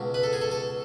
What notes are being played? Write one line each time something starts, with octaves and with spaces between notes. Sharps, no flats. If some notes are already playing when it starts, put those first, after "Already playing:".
Already playing: C#2 B2
B4
A4
G#4
A4
A4